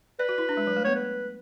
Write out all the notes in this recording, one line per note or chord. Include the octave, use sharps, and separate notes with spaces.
B4 D5
F#4
E4
D4
G#3
F#3
A3
B3 C#5
B4